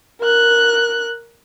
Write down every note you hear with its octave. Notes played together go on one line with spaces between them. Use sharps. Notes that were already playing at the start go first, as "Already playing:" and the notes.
A#4 F#6